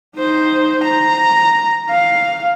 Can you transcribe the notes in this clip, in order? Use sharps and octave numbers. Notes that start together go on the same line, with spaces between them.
D#4 C5
A#5
F5